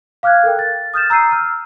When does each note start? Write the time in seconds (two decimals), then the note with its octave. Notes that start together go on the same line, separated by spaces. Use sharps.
0.23 F5 D6 F6 F#6 G#6
0.44 A4 A#4 G5
0.59 A6
0.94 D#6 F6 G6 A6 E7
1.10 A#5 E6 G6 C7 D#7
1.32 E6 F6